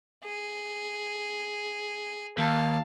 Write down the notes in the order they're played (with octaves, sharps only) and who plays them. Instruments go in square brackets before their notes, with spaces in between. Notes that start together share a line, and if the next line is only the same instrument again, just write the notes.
[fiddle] G#4
[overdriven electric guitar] D#2 [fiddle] F5 A5